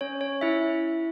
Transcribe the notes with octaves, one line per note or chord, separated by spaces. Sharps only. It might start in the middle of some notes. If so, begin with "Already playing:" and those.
C#4 C#5
C#5
E4 E5